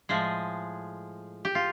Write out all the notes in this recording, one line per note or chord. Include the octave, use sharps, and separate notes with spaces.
A2 F3 G#3 G#4
G4
F4